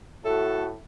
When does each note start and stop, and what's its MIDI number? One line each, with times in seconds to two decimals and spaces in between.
0.25 0.76 45
0.25 0.76 57
0.25 0.68 66
0.25 0.64 69